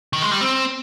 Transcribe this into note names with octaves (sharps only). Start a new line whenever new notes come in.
D#3
G#3
G3
C4